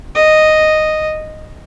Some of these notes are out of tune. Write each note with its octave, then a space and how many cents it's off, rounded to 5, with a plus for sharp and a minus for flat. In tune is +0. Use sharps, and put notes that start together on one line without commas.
D#5 -5